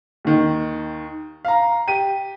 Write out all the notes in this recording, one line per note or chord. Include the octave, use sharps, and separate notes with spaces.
D#2 D#3
F5 A#5
G4 D#7